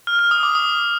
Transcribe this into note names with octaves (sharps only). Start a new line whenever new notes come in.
F6
F6
D#6
D6
D#6